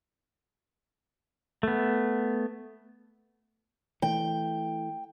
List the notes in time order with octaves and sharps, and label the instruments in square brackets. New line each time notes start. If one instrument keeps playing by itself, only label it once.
[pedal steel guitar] A3 B3
[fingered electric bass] E3 A3 [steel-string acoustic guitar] G5